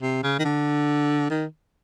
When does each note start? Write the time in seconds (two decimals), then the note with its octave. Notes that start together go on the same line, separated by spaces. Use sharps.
0.02 C3
0.23 C#3
0.39 D#3
0.45 D3
1.30 D#3